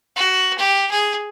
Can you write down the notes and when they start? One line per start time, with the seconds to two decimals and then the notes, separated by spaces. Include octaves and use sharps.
0.16 F#4
0.59 G4
0.91 G#4